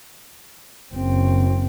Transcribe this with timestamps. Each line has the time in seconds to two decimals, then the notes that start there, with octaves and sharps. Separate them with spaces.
0.94 F#1 C4